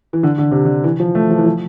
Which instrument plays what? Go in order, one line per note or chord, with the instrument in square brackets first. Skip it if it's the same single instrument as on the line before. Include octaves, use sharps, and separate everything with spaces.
[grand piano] E3
D3
D3
C3
D3
E3
F3
A3
F3
E3
F3